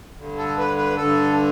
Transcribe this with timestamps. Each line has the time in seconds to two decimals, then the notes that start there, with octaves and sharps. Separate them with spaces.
0.18 G2 D3
0.38 A4
0.58 B4
0.77 B4
0.97 G2 D3 A4